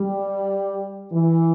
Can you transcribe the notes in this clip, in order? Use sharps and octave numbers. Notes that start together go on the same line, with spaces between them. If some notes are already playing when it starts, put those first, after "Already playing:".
Already playing: G3
E3